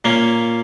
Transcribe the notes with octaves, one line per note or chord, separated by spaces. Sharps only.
A#2 A#3 C#4